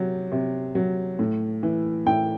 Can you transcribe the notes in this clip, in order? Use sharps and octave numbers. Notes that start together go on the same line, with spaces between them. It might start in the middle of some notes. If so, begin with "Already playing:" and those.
Already playing: C3 F#3
C3
F#3
A2
E3
A2 G5